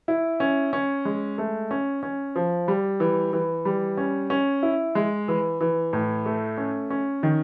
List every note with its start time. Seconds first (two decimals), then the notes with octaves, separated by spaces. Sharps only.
0.08 E4
0.40 C#4
0.73 C#4
1.05 G#3
1.38 A3
1.71 C#4
2.03 C#4
2.35 F3
2.68 G3
3.00 E3
3.33 E3
3.65 G3
3.97 C#4
4.30 C#4
4.63 E4
4.95 G#3
5.28 E3
5.61 E3
5.93 A2
6.26 A3
6.58 C#4
6.90 C#4
7.23 D#3